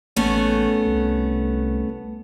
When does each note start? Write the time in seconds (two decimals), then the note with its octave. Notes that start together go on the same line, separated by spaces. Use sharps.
0.16 A1 A3 B3 C#4
0.86 C2